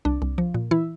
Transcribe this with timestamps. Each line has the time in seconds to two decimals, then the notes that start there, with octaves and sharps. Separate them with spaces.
0.05 C2 D4
0.22 C2
0.38 F3
0.54 A#2
0.71 E3 E4